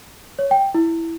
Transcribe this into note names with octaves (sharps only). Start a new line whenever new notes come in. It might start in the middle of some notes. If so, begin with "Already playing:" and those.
C#5
G5
E4